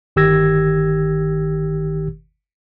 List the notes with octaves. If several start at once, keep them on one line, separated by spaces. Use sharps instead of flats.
G1 D#3 G4 E6 G#6 A#6